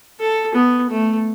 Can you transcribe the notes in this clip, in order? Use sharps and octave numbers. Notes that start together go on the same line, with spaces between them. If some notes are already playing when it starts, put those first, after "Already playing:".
A4
B3
A3